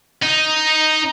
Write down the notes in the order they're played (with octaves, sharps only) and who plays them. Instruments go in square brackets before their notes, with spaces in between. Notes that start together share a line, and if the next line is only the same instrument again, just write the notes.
[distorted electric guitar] D#4